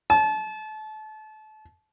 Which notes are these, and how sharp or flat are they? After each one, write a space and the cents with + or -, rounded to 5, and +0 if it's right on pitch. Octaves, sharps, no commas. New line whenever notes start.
A5 -30